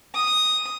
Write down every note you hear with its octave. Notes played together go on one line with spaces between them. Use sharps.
D#6